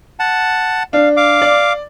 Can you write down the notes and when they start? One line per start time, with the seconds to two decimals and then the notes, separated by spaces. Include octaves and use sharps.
0.19 F#5 A5
0.93 D4 F5
1.17 F5 D6
1.42 D5